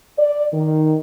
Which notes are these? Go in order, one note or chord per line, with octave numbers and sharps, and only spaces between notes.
D5
D#3